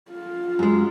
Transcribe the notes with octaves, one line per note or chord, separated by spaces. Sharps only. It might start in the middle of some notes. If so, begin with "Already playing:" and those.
F4
F#2 G#3